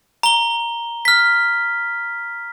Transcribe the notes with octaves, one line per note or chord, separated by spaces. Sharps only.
A#5 G7
F6 B6